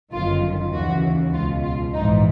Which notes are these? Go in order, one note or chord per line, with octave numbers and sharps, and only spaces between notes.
G1 F#2 D#3 F4
D#2 C#3 E3 F#4
C#2 B2 F4
F4
A#1 G#2 E3 D#4